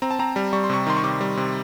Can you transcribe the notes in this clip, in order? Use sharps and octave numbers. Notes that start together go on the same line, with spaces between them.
C4 A#5
A5
C4 A#5
G3
G3 C#6
C6
C3 C#6
D#3 C6
C#6
C3 D6
G3
C3